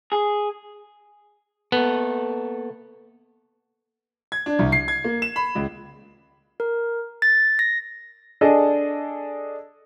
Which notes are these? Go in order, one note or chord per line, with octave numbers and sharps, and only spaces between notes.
G#4
A#3 B3 A4
G#6
D4
C2
C7
G#6
A#3
E7
B5
C#2
A#4
A6
A#6
D4 G#4 A4 D5 D#5